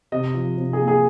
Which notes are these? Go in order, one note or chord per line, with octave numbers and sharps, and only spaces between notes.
C3 D#5
F3
C3
G#4
A#3
G#4